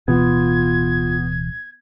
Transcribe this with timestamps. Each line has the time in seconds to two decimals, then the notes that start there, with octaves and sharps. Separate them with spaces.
0.08 D1 B2 E3 B3 F4 G#6